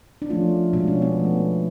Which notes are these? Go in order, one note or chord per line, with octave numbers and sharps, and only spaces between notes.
D4
F3 A3 C#4 F4
B2 G#3 B3 D4
C#4
B3
F3 A3